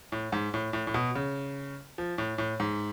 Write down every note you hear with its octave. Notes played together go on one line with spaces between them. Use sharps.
A2
G#2
A2
A2
A2
B2
C#3
F3
A2
A2
G#2